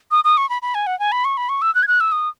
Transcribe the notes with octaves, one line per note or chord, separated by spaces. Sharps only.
D#6
D#6
C#6
B5
B5
G#5
F#5
G#5
B5
C#6
B5
C#6
E6
F#6
G#6
F#6
E6
D#6